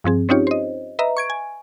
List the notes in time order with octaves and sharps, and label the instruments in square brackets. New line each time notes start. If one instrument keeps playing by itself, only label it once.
[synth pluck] G2 F3 C4 G#4
C4 C#4 D#4 F4 G4 C#5
C5 D#5
B4 D#5 E5 A#5
C#6 G#6 D7
G#5